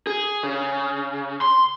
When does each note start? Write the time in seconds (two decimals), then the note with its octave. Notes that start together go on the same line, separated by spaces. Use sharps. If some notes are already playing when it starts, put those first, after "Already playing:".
0.07 G#4
0.43 C#3
1.41 C6